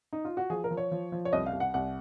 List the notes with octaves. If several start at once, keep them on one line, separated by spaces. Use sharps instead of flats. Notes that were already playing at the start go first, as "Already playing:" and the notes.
D#4
F4
F#4
F3 G#4
A#4
F3
C#5
F3
F3
C#5
C2 D#5
F5
C2
F#5
C2 F#5